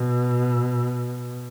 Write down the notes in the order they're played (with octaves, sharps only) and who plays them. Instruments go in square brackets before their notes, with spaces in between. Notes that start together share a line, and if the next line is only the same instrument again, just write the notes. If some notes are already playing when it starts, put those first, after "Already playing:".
Already playing: [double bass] B2